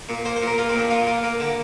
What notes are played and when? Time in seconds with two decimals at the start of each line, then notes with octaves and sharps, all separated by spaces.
0.09 A#2
0.25 A#3 C5
0.36 C5
0.42 A#2
0.47 A#4
0.58 A#3 F4
0.69 C4
0.74 A#2
0.80 D4
0.91 A#2 F4
1.07 A#3
1.24 A#3
1.40 D3